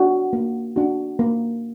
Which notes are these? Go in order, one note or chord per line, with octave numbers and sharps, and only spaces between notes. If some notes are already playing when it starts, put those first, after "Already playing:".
Already playing: D4 F#4
A#3
D4 F#4
A#3